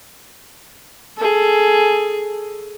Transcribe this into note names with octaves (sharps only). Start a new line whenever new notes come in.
G#4 A4